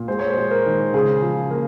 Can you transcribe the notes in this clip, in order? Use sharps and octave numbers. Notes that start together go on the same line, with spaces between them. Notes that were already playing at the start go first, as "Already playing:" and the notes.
Already playing: A#2
G#3 C5
C#5
C5
G#3
A#4
D#3
C#3 G#4
F3
A#3